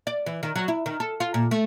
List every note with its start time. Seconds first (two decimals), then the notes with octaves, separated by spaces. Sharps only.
0.07 D5
0.26 E3
0.43 D#3
0.56 F#3
0.68 E4
0.86 D#3
1.00 A4
1.20 F4
1.34 A#2
1.51 A3